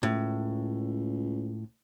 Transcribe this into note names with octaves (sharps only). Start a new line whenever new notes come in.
C#2 A2